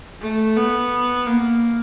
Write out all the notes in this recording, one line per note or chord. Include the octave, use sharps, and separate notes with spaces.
A3
B3
A#3